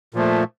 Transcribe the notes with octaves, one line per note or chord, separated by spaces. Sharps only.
A#2 F3 A3